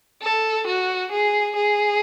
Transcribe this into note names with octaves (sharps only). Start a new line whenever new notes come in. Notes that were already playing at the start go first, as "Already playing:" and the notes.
A4
F#4
G#4
G#4